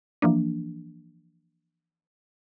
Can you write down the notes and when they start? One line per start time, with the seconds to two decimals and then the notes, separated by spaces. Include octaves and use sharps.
0.22 E3 F3 A#3 D4